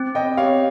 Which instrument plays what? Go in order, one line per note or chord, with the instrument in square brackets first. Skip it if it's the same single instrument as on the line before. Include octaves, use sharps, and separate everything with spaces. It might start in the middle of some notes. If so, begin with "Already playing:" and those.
Already playing: [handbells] C4
[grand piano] D#5 G5
[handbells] G4 [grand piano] C#5 F5